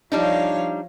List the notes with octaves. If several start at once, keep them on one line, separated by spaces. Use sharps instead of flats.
F3 G3 D4 D#4 C#5 F5